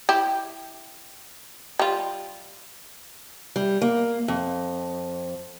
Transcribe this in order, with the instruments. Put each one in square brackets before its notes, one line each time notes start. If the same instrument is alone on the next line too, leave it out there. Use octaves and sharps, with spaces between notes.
[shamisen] E4 G4
G3 F4
[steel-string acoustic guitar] G3
A#3
F2